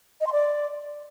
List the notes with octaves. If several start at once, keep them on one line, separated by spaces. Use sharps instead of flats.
D#5
C6
D5